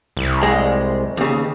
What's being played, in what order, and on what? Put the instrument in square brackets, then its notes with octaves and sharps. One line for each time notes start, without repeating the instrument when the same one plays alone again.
[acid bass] C2
[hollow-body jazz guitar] G#3
D#2 C#3